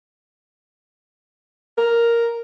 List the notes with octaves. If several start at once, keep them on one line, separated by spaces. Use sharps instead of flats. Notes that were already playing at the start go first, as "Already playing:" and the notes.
A#4